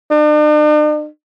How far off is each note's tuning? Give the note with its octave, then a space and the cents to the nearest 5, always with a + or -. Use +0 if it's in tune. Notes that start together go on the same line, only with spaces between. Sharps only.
D4 +45